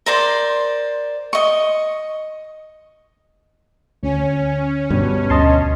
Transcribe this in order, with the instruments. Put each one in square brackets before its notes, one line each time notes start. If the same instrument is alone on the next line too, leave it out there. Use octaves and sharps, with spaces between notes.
[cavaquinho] A#4 C5 D5 C6
D#5 C#6
[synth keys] D2 [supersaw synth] C#4
[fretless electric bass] G2 B2
[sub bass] D2 [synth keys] D#5 A5 C6